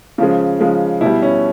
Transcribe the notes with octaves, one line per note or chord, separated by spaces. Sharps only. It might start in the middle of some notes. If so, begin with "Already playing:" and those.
C#3 F3 G#3
C#3 F3 G#3
B2 G3 E4
C#4